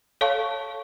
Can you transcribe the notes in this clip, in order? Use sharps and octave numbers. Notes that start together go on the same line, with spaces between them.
A4 C#5 F5 A5 C#6